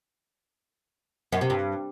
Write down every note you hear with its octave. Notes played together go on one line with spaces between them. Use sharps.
F#2
C3
G2